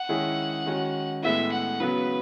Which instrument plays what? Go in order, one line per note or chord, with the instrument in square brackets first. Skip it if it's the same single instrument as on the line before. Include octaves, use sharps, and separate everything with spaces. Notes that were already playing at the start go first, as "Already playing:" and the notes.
Already playing: [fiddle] F#5
[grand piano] D#3 G#3 C#4 E4 G#4
D#3 G#3 C#4 F#4
[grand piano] A2 G#3 B3 E4 [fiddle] E5
[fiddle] F#5
[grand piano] C#3 F#3 B3 F#4 [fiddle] B4